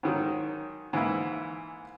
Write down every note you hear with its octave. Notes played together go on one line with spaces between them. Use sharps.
G#2 D#3 F#3
G#2 E3 A#3 E4